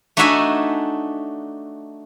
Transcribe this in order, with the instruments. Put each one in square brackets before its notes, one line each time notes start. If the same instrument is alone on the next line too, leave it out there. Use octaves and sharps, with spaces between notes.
[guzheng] A3 D4 D#4 F#4 E5 G#5